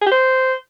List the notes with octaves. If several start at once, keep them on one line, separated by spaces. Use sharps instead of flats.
G#4
G4
C5